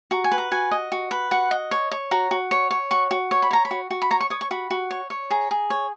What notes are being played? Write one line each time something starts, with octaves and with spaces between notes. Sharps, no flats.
F#4 A#5
G#5
B4
A#5
F#4 G#5
D#5
F#4
B4
F#4 F#5
D#5
C#5
C#5
F#4 A#5
F#4
C#5
C#5
F#4 C#6
F#4
C#5 C#6
B5
C#5 A#5
B5
F#4
F#4
B5
C#5 A#5
C#6
C#5 D#6
C#6
F#4 B5
F#4
C#5
C#5
G#4 A#5
G#4
C#5